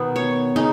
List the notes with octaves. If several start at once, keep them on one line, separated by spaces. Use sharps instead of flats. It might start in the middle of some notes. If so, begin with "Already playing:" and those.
Already playing: B2 D#3 B3
C#5
C#3 D#4